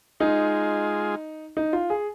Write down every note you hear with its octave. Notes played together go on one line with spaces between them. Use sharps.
G#3 D#4 F4 G#4
D#4
F4
G#4